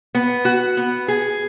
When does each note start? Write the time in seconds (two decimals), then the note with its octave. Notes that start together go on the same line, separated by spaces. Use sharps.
0.15 B3
0.45 F#4
0.77 B3
1.08 G#4